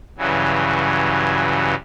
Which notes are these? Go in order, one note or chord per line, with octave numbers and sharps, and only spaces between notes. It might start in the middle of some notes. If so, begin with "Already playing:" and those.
G2 C#3 E3 F#3